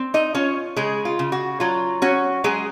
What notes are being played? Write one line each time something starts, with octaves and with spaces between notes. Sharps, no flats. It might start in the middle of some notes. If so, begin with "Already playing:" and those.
Already playing: C4
D#4 D#5
C#4 F4 C#5
C#3 G#3 G#4
F4
C#3
F#4
F#3 F4
C#4 F#4
F#3 G#3 G#4